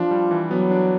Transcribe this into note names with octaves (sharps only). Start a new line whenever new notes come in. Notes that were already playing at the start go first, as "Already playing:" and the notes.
Already playing: F3 D4
G3
E3
F#3 B3
D4